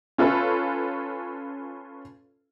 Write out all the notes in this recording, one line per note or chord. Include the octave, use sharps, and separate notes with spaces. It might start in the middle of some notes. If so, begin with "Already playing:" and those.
C#4 F4 A4 B4 C#5